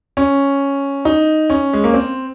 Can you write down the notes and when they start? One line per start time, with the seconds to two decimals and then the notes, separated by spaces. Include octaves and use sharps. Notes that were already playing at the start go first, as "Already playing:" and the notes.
0.17 C#4
1.05 D#4
1.50 C#4
1.73 G#3
1.84 A#3
1.94 C4